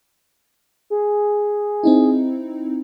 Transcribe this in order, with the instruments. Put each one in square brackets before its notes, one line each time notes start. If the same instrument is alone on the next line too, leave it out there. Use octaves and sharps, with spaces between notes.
[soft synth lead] G#4
[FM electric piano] C4 D#4 E4